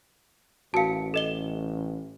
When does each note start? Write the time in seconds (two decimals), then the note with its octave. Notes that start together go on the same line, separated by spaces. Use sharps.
0.74 A1 F#4 A#4 F5 A5 C#7
1.14 A4 D#5 G7